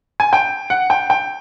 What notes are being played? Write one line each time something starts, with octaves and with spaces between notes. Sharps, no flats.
G#5
G5
F#5
G5
G5